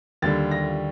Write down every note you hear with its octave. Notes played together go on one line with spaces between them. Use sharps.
D#2 D3 G3 A6
A#6